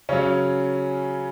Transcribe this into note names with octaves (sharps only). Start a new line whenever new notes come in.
C#3 F#3 C#4